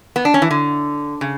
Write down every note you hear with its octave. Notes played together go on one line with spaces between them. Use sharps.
B3
D4
C#4
E3
D3
C#3